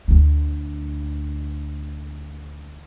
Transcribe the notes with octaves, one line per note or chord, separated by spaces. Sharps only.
D2 D3